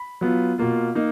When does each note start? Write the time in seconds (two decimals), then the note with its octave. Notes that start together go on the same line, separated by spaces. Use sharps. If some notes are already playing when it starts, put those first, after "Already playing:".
Already playing: B5
0.21 F#3 B3 F4
0.58 B2 A#3 F4
0.95 A#3 D#4